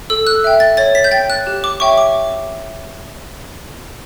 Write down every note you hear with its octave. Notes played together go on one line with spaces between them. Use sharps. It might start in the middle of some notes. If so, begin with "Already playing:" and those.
A4 E6
F#6
E5 G5
A6
C#5 A6
B6
G6
G5 A6
F#6
G4
D6
C#5 E5 G5 C#6
D6